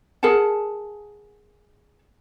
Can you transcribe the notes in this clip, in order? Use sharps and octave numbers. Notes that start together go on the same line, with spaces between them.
G#4 A#4 F#5 A5